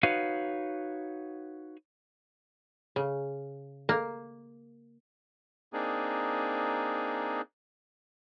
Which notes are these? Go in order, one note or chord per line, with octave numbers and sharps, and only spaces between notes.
D#4 F#4 B4 C#5 F5
C#3
A#3
A#3 C4 D4 D#4 G#4